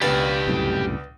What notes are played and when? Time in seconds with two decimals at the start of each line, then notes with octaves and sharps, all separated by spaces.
0.02 C#2 B2 D4 G4 B4 D5 F5 F#5
0.48 C2 F#2 A2